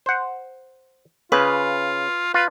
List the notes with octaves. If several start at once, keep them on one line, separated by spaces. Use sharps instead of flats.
C5 F#5
C#3 F4 B4
F4 B4